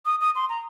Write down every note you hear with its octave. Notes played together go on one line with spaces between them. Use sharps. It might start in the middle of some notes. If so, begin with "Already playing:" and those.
D#6
D#6
C6
A#5